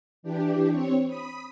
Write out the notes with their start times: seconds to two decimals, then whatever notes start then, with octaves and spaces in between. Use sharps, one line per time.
0.23 E3 D4 G4
0.69 C4 C#5
1.07 B5 D#6